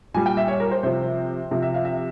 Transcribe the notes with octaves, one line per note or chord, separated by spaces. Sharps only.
A#2 G3 G#5
G5
E5
C#5
A#4
C5
C3 F3 C5
C3 F3
E5
F5
E5